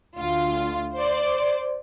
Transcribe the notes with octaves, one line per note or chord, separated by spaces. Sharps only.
D2 F4
C5 D5